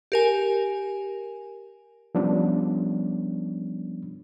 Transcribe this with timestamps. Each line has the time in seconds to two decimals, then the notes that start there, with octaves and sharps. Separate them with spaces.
0.12 G4 A#4 G#5
2.15 F3 G3 B3 C#4 D4